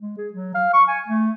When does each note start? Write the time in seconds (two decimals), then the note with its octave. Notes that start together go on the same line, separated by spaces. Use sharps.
0.01 G#3
0.18 G#4
0.33 F#3
0.54 F5
0.73 C#6
0.88 G#5
1.08 A3